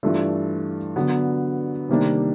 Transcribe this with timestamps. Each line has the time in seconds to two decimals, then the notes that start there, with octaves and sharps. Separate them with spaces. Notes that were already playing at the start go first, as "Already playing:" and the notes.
0.03 G2 E3 A3 D4 F4
0.96 D3 F#3 B3
1.89 C3 D#3 G3 A#3 D4